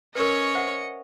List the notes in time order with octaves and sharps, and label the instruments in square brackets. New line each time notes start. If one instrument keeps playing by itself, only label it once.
[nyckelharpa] C#4 C#5 [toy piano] A#4 B4 [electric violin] D#5 C#7
[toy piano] C5 E5 F#5